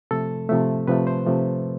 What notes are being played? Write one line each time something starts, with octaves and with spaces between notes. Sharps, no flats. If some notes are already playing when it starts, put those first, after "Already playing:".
C3 F3 A3 A4
C3 F3 A3
C3 F3 A3 B4
C5
C3 F3 A3